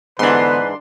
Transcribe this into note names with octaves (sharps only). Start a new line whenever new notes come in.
G#2 D3 E3 B3 D4 B4 C6